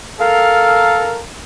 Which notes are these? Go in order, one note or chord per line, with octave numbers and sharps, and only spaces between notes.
A4 A#4 F5